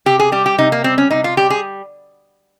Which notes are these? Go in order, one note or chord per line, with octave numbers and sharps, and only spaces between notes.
C3 G4
G#4
G3 G4
G4
C3 D#4
A#3
G3 C4
C#4
C3 D#4
F4
G3 G4
G#4